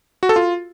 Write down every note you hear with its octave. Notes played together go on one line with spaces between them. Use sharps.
F#4
A4
F4